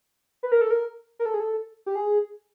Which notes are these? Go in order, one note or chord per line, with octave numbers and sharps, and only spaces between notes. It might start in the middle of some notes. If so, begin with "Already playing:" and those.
B4
A#4
A4
A#4
A#4
A4
G#4
A4
G4
G#4